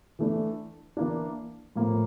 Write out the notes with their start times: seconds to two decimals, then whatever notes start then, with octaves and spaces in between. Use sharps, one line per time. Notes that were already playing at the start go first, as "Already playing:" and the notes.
0.19 E3 A3 D4
0.97 E3 A#3 D4
1.75 A2 F3 A#3